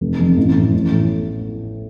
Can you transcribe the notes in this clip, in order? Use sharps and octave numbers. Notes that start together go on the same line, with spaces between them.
F1
F2
A1
A2
A1
A2